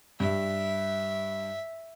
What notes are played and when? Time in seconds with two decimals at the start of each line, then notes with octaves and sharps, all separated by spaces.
0.20 G2 E5